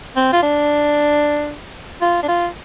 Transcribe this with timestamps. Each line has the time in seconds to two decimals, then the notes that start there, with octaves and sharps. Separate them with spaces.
0.16 C4
0.33 F4
0.43 D4
2.02 F4
2.23 D4
2.28 F4